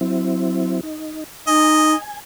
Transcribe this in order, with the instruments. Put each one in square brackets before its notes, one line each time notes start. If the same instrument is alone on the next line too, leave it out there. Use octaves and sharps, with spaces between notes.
[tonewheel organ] F#3 C4 E4
D#4
[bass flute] D#4 [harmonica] D#5 [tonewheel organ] G#5